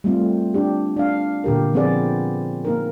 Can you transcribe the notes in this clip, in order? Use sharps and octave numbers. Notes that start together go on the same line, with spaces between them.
G3 A3 C4 F4
D4 G4
D4 F5
A#2 D3 G4 A#4
F3 B3 C4 G#4 D5
A#3 D#4 A#4